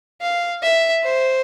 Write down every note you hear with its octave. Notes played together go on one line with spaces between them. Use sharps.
F5
E5
C5